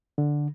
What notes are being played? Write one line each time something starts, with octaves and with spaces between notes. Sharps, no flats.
D3